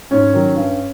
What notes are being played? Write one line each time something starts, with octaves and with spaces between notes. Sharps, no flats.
G#2 C#4 C#5
D#3 F#3
G2